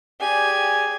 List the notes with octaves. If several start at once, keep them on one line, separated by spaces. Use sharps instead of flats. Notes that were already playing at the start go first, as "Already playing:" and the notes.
G4 G#4 D5 G#5